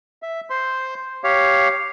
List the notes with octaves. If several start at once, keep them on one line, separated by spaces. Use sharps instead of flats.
E5
C5 C6
G4 C#5 F5